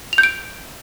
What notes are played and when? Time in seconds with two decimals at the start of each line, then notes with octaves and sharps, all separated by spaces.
0.13 F7
0.18 G6
0.23 D7